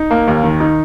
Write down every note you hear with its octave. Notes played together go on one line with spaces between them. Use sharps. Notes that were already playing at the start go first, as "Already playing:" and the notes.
Already playing: D#4
A#3
D#2
D#3
D#4